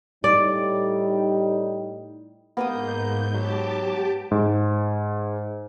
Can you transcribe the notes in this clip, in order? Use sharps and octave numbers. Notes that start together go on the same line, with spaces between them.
A2 G3 D#4 D5
G#2 A#3 B3 B4 D#6 G6
F#3 G4 A5 D6
G#2